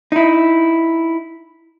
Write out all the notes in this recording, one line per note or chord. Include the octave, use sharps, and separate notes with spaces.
D#4 E4